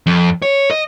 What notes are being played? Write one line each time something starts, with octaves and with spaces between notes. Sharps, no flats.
F2
C#5
D#5